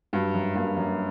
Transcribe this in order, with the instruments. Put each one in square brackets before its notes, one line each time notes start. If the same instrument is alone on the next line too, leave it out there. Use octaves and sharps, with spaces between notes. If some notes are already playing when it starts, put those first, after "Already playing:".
[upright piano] G2 [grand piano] F#3
[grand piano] F#2
[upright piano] G2 [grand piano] A#3
[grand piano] F#2